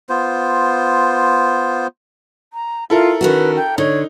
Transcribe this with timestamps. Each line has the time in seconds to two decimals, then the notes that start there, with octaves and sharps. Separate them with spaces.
0.09 B3 F4 C5
2.53 A#5
2.90 E4 F4 A4 A#4
3.21 D#3 C#4 F#4 B4
3.56 G5
3.78 D3 D#4 C#5